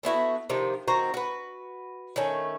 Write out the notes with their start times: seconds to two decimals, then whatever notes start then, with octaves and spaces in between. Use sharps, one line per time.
0.03 A3 B3 E4 F#4
0.50 C3 D#3 F3
0.88 D#3 C4 F#4 A#5
1.14 F#4 B4
2.16 D#3 A3 C#4